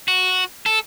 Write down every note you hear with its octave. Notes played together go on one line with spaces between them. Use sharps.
F#4
A4